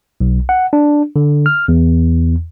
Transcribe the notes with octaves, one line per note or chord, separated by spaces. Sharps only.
B1
F#5
D4
D3
F6
E2